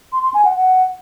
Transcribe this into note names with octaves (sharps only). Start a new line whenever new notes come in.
C6
C6
G#5
F#5
F#5